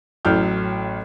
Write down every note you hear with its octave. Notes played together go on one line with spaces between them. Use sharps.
A1 A2 F#3 G5 F6 G6